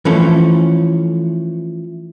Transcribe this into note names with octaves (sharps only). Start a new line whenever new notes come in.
E3 F3 A3 C#4